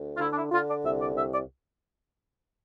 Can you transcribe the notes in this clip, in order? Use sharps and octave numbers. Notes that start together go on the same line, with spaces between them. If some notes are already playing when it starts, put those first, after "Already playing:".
Already playing: D2
F4
D3 E4
D4
E4
D3 F4
D5
C2 E5
D5
C2 E5
D5